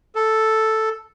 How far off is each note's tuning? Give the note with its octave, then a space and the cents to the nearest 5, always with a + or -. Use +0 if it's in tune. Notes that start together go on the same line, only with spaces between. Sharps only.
A4 +0